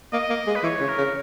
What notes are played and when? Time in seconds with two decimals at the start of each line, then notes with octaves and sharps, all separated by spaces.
0.13 A#3 D#5
0.30 A#3
0.47 G#3
0.55 B4
0.63 E3 C#5
0.80 C#3
0.89 A#4
0.98 C#3